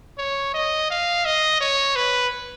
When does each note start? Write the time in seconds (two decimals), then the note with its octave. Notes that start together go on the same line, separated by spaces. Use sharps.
0.18 C#5
0.54 D#5
0.90 F5
1.25 D#5
1.61 C#5
1.96 B4